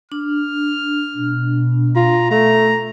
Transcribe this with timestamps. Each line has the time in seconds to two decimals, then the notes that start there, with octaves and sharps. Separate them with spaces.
0.12 D4 F6
1.13 B2
1.96 F4 A#5
2.31 A3 A#5